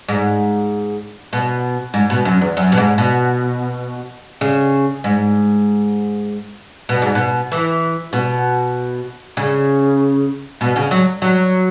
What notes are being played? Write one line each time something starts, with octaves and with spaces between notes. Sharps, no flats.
G#2
B2
G#2
B2
F#2
E2
F#2
B2
G#2
B2
C#3
G#2
B2
G#2
B2
E3
B2
C#3
B2
C#3
F#3
F#3